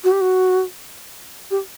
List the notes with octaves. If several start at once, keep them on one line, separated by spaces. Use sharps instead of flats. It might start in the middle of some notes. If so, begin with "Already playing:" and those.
F#4
G4
F#4
G4